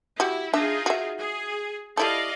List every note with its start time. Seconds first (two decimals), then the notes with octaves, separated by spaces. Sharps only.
0.20 G3 E4 F#4
0.53 D4 D#4 F4 G#4 E5
0.86 F#4 E5
1.19 G#4
1.97 G3 E4 A4 D5 D#5 F5